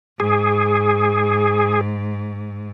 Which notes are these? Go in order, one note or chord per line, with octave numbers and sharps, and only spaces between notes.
G#2 G#4